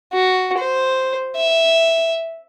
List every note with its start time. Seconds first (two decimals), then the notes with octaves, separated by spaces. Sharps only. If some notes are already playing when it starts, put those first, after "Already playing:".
0.13 F#4
0.58 C5
1.36 E5